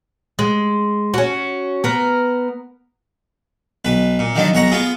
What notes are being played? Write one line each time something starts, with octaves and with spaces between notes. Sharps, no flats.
G#3
C#4 F#4
B3 A#4
B1 B4
A#2
D3 D#3 F3 F#3 D4
B1 C#5 F#5 A#5
B3 F4 G#4